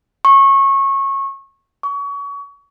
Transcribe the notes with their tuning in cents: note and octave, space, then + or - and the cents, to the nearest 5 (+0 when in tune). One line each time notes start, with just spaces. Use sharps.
C#6 -20
C#6 +30